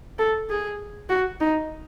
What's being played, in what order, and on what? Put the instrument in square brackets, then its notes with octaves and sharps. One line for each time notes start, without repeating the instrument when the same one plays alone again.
[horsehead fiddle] A4
G#4
F#4
D#4